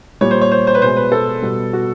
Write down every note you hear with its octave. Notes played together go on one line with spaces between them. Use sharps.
A#2 G3 C#5
C5
C#5
C5
C5
B4
B2 G#3 C5
B4
A4
B2 G3
F#4